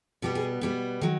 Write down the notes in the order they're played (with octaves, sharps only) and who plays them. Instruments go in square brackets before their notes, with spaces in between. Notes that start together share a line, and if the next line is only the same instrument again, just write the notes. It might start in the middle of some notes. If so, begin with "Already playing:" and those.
[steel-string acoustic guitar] B2 G3 B3 G4
G#4
B2 G3 B3
D#3 F#3